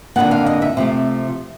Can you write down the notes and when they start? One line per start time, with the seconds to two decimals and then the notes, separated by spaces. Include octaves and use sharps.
0.16 F2 D3 F#3 A#3 F#5
0.31 F5
0.46 D#5
0.62 E5
0.77 C3 F3 A3